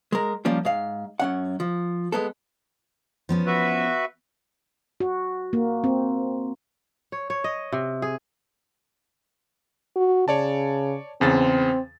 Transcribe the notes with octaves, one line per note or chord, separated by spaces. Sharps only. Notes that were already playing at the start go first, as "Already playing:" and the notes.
G#3 A#4
F3 G3 A#3 C#4 F4
G#2 F5
F#2 C#4 F#5
F3
G#3 B3 A4
F3 B3 C#4
F#4 B4 E5
F#4
A#3
C4
C#5
C#5
D#5
C3
G#4
F#4
C#3 C#5 D5 A5
E2 C#3 C4 A6